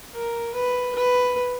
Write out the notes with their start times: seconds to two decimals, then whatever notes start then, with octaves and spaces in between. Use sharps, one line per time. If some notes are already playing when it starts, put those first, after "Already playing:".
0.13 A#4
0.54 B4
0.95 B4